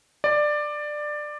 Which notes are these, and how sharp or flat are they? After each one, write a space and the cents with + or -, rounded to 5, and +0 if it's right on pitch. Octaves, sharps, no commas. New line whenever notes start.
D5 +15